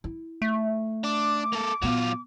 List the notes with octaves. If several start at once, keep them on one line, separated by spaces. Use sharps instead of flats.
E4
A3
D4 D6
A#3 A4
A#2 F#3 B3 F4